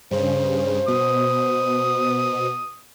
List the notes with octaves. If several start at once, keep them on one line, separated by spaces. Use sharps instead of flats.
G2 C#3 C5
B2 D#6